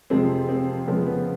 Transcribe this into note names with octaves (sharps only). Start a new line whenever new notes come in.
F2 C3 F3 G#3 C4
C4
F2 C#3 F3 G#3 B3
B3